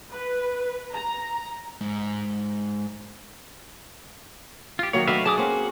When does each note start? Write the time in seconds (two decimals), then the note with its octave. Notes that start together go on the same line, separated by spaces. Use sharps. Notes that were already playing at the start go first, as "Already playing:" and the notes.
0.11 B4
0.94 A#5
1.81 G#2
4.79 F4 G4
4.93 D#3 F#3 A#3 C#5
5.07 A3 D4 F#4 B4 E5 F5
5.26 D4 G#4 A5 D6 D#6
5.38 A#3 C4 C#4 F#4